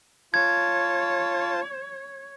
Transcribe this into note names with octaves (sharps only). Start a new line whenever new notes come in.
F4 C#5 A5 G#6